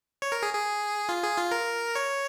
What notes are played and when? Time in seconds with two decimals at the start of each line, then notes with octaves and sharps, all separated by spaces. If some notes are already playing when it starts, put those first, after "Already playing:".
0.22 C#5
0.32 A#4
0.43 G#4
0.53 G#4
1.09 F4
1.23 G#4
1.37 F4
1.51 A#4
1.95 C#5